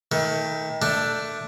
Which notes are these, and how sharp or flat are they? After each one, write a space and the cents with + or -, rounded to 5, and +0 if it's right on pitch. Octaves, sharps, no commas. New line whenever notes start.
D#3 +35 A3 +15
A3 +10 D4 +0